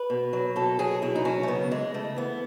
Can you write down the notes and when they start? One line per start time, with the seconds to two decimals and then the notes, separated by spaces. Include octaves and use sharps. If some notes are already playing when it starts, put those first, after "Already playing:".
Already playing: B4
0.10 B2
0.33 F#3
0.56 B2 A4
0.79 F#3 G#4
1.02 B2 E4
1.15 D#4
1.25 F#3 C#4
1.43 A3
1.48 C#3 B3
1.71 E3 G#3
1.94 C#3 A3
2.16 E3 B3